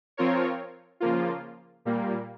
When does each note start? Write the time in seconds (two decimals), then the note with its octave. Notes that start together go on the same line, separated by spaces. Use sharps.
0.17 F3 C4 F4 A#4 C#5
1.00 C#3 F3 A#3 F4
1.85 A#2 G3 A#3